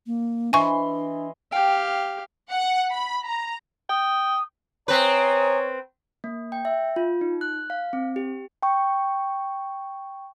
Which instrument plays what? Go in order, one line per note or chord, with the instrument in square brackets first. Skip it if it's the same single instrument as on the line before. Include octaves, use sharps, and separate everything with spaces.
[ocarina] A#3
[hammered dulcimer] E3 D#5 C6 [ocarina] D4 [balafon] G#5 C#6
[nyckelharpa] G4 F5 [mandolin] G5 G6
[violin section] F#5
B5
A#5
[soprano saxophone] G5 [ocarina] D#6
[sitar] C4 B4 [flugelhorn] C#5 [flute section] G#5 A#5 D#6
[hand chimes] A#3
G5
E5
F4
D#4
F#6
F5
C4
G4
G5 C#6